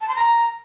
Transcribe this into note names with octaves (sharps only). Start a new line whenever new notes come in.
A5
C6
A#5